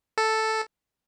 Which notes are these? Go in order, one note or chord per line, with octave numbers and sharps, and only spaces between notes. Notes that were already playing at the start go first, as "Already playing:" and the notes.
A4